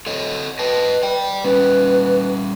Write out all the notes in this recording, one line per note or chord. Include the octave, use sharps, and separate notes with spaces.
A4 C#5 D#5
B4 D#5 G5 A5
D5 G5
G3 C#4 B4